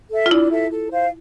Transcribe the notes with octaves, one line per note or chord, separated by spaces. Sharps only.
A4 E5
F4
D4 E4
A4 E5
A4
C5 F5